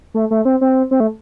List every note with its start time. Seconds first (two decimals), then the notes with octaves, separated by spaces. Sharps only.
0.14 A3
0.31 A3
0.45 C4
0.61 C4
0.91 C4
1.00 A3